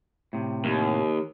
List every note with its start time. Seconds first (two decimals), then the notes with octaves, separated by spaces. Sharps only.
0.33 A2 C3
0.65 D#2